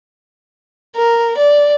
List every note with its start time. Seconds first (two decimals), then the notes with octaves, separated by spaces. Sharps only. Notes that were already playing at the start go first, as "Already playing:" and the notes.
0.96 A#4
1.37 D5